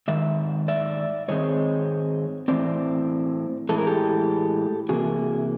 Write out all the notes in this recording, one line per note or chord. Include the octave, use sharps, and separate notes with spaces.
G#2 D#3 E5
D5 E5
G#2 D#3 G#3 C4 C#5 D#5
A2 E3 A3 C4 C5 D5
A2 E3 G#3 A4
A#4
G4 A4
C3 E3 A#3 F#4 G#4